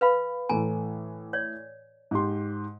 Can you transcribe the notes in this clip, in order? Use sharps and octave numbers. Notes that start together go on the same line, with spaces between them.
B4 F5 B5
A2 E3 A3 G#5 A#5
C#5 D5
G#2 G4 C6